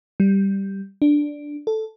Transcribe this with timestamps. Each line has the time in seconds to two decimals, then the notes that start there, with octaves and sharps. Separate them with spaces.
0.20 G3
1.02 D4
1.67 A4